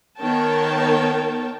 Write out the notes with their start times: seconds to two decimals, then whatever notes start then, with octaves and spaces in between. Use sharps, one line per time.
0.19 D#3 B3 A#4 C#5 G5 A5